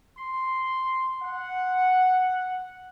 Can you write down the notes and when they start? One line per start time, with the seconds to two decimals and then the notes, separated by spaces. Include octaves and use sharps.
0.18 C6
1.22 F#5